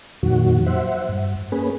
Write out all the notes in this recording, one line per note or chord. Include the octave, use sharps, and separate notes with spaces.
F2 A#2 D#3 F#3 F#4
C5 E5 F#5
G2
A#3 C#4 G#4 B4